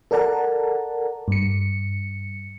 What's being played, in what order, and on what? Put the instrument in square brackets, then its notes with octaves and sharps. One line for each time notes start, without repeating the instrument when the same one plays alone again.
[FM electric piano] A4 A#4 D5 F#5 A5 A#5
G2 C#7